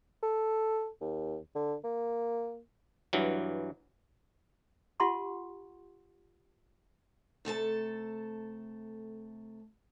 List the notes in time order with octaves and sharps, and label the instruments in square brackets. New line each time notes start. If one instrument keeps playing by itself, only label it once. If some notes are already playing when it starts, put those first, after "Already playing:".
[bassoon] A4
D#2
D3
A#3
[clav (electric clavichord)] G2 E3 F#3
[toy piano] F4 G4 F#5 A5 C6 C#6
[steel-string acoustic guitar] C3 A3 A4 A5